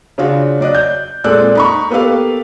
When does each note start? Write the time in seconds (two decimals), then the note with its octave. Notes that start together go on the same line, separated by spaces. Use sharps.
0.18 C#3 D4 F4 F#4
0.60 F#3 D5 D#5 F#6
0.75 G6
1.24 A#2 G#3 C4 A4 D5 F#6
1.55 D#4 B5 C#6
1.90 A#3 B3 G4 A4 B4 F5